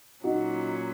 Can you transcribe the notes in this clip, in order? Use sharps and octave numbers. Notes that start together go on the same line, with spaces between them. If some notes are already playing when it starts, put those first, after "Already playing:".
A#2 F#3 C#4 D#4 F#4